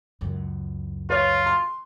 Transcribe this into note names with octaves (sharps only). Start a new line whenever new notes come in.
C#2 F#2
F4 B4 C#5
C6